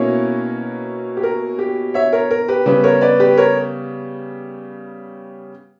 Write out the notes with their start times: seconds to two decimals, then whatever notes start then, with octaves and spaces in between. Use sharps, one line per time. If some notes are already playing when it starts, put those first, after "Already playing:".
Already playing: B2 A#3 C#4 E4 A#4 C#5
1.17 G4
1.23 A#4
1.59 G4
1.94 C#5 E5
2.13 A#4 C#5
2.31 A#4
2.48 G4 B4
2.66 C#3 G3 B3 G4 B4
2.84 A#4 C#5
3.01 B4 D5
3.20 G4 B4
3.37 A#4 C#5